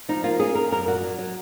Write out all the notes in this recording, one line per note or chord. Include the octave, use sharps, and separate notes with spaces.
F3 D#4
A#3 F4
C#4 G#4
A#3 A#4
F#2 A#4
A#2 F#4
F#3
F#3